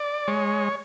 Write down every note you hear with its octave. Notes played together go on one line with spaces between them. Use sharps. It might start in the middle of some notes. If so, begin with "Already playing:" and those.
Already playing: D5
G#3 C#5